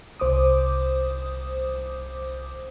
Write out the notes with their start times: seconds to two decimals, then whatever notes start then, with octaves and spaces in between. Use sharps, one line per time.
0.20 C2 C5 D6 D#6